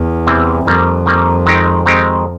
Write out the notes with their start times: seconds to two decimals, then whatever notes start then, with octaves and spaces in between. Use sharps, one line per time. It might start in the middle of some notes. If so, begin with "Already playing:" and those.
Already playing: E2
0.27 C3 E3 G3 C4 E4
0.67 F2 D#3 G3 A#3
1.06 D#3 G3 A#3
1.46 D#3 G#3 C4 D#4 G4
1.86 D#3 G#3 C4 D#4 G4